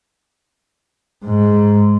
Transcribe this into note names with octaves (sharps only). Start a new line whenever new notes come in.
G#2